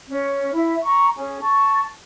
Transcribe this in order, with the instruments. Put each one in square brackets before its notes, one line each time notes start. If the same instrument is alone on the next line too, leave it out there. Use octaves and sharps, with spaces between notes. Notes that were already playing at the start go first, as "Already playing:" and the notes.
[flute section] C#4
E4 E5
A#5 C#6
C#4 G#4
A5 C#6